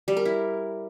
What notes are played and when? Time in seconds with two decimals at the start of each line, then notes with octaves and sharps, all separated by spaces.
0.08 G3
0.17 A#4
0.25 E4